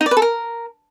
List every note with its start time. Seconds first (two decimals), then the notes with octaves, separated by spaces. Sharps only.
0.01 D#4
0.06 D5
0.11 B4
0.17 A4
0.22 A#4